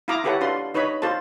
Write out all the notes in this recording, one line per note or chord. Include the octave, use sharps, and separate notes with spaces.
E4 F4 F5 A#5 D6 D#6
E4 G4 A4 B4 C#5 F#5
D4 F4 B4 C6
D#4 B4 C#5 D#5 B5
F4 A4 C5 A5